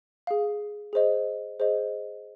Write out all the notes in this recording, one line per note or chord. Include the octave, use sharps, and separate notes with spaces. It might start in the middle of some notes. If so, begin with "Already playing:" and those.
G#4 F5
G#4 C5 D#5
G#4 C5 D#5